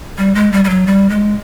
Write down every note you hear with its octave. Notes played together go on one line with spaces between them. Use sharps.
G3
G#3
G3
G3
F#3
G3
G#3